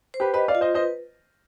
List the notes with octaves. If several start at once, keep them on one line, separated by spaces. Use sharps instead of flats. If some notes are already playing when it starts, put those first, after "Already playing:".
C5
G4 B4
G4 B4 D#5
D5 F5
F4
C5 D#5
B4 C5 D#5